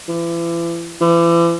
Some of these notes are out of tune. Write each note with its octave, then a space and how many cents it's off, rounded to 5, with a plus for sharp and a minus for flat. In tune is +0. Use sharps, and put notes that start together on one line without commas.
E3 +40
E3 +40